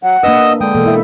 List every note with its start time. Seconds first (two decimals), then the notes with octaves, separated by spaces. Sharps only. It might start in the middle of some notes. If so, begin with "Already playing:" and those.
0.03 F#3 F#5
0.23 A#3 D4 B4 D#5 D#6 E6
0.61 D3 G#3 G5 D#6
0.75 B2 E3 A#3 A4
0.86 E4 E5